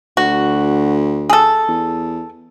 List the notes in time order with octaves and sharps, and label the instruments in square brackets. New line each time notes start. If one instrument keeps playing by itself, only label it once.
[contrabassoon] D2 [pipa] F#4
[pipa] G#4 A4
[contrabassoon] E2